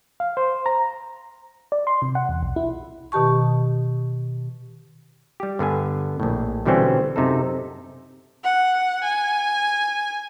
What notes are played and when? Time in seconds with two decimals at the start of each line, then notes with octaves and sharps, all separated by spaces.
0.20 F5
0.37 C5
0.66 A#5
1.72 D5
1.87 C6
2.02 C3
2.15 F#5
2.29 E2
2.43 B1
2.56 E4
3.12 B2 D#3 G4 A5 C#6
5.40 G3 G4
5.59 G2 D3 B3 G#5
6.20 A#1 A2
6.66 B2 D3 E3 G3 C4 C#4
7.16 F#2 C3 D#4 A4
8.44 F#5
9.04 G#5